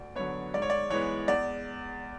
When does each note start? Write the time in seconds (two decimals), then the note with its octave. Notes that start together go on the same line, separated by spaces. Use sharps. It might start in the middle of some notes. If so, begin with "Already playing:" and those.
Already playing: D2 D5
0.16 D3 F#3 B3 C#5
0.54 G#2 D5
0.62 C#5
0.70 D5
0.90 E3 G#3 B3 C#5
1.28 E2 D5